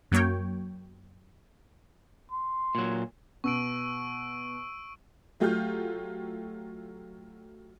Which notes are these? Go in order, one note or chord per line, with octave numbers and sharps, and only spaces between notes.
F#2 F#3 A#3 C#5 G5
C6
A#2 F#3
B2 C#6 E6 D7
F#3 A3 F4 G4 F6 G6